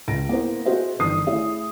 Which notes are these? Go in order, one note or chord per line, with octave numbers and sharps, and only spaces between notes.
C#2 A#6 D7
A#3 B3 E4 A#4 C5
F#4 G#4 A4 C5 D#5 E5
G1 D#3 E3 D#6 C7
A3 E4 G#4 C#5 E5